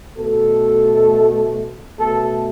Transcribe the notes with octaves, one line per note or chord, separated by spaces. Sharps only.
B2 A3 A4
B2 A3 A4